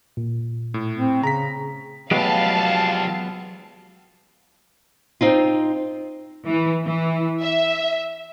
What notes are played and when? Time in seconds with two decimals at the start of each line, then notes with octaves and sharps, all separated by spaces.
0.17 A#2
0.74 A2
0.97 C4
1.23 C#3 A#5 B6
2.11 F3 F#3 G#3 B3 G4 F5 A5
5.21 C4 D#4 F4
6.48 E3
6.84 E3
7.43 E5